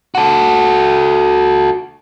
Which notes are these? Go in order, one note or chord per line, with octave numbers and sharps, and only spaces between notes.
F#4 A4